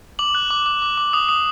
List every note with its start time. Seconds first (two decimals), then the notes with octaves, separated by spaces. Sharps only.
0.19 D6 F#7
0.35 F#6
0.50 D6
0.66 D6
0.82 D6
0.97 D6
1.13 D#6
1.29 D#6